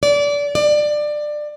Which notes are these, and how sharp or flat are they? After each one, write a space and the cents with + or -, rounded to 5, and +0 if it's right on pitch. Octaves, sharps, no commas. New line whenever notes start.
D5 -25
D5 +20